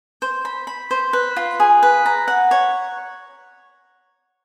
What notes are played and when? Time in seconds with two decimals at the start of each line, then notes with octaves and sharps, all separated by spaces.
0.22 C5
0.45 B5
0.67 B5
0.91 C5
1.13 B4
1.36 F4
1.60 G#4
1.83 B4
2.06 A#5
2.28 F#5
2.51 C#5